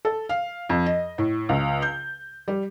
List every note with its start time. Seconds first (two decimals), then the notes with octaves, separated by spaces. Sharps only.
0.05 A4
0.29 F5
0.70 F2
0.86 D#5
1.18 A2
1.49 C#2
1.82 G6
2.48 G3